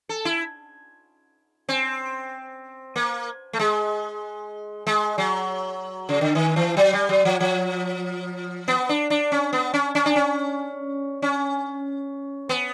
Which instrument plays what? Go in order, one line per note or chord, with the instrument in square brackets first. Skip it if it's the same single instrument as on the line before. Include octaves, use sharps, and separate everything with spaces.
[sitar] A4
E4
C4
A#3
A3
G#3
G#3
F#3
C#3
D3
D#3
E3
F#3
G3
F#3
F3
F3
B3
D4
D4
C#4
B3
C#4
C#4
D4
C#4
C#4
B3